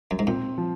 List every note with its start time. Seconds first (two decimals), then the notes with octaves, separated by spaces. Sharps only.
0.11 F#2
0.19 G#2
0.27 A#2 C4
0.58 F3